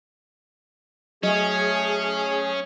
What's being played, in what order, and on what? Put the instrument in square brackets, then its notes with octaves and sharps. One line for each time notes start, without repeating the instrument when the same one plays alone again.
[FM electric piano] F#3 [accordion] A3 G#4 [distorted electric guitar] C#4 [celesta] D#5